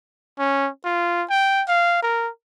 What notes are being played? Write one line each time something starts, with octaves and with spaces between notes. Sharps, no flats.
C#4
F4
G5
F5
A#4